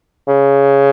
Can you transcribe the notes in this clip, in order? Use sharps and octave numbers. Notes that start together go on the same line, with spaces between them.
C#3